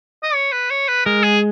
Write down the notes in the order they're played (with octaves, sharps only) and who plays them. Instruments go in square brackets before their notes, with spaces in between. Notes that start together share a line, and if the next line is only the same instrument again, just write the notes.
[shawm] D#5
C#5
B4
C#5
B4
[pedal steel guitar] G#3 [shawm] A#4
[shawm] G#4